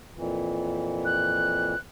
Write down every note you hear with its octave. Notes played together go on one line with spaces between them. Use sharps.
F2 A#2 E3
F#6